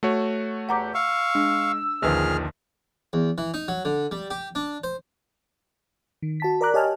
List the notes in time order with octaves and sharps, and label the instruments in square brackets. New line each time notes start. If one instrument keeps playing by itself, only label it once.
[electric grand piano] A3 F#4 C#5
[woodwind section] E2 G4 [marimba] F#5 A#5 D6
[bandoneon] F5 C#6 [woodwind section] E6
[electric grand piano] G#3 [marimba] D4
[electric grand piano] A#1 D#3 F3 [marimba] D#2 D3 B4 [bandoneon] G#4 F6
[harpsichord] E2
E3
D#4
F#3
D3
G3
G4
D4
C5
[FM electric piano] D#3
F#4 A5 B6
A#4 D5 A#5 D6 F#6
G4 C#5 D#5 G#5 A5 F6